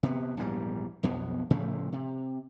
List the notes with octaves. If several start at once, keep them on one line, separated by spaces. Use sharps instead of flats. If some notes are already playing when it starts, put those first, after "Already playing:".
C3 B3
A#1 E2 G#2 G3
B1 F2 B2 B3
A2 C#3 F3 A3
C3